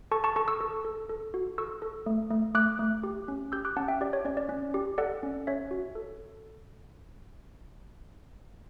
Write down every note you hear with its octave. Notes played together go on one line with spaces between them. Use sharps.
A4 A5 C#6
A5 C#6
A4 A5 C#6
C#6 E6
A4
A4
A4
F#4
A4 C#6 E6
A4
A3
A3
A3 D6 F#6
A3
G4
C#4
G4 E6 G6
D6 F#6
C#4 F#5 A5
E5 G5
G4 D5
C#5
C#4 D5
D5
C#4
G4
A4 D5 F#5
C#4
C#4 C#5 E5
F#4
A4